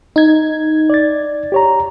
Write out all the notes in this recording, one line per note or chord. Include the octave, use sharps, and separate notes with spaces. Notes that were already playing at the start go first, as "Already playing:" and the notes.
D#4 G#6
D5 A6
G4 C#5 A#5